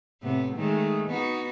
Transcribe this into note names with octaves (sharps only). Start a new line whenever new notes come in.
A2 C3 B3
D#3 G#3 A3
B3 D#4 F#4